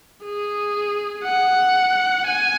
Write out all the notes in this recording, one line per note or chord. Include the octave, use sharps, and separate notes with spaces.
G#4
F#5
G#5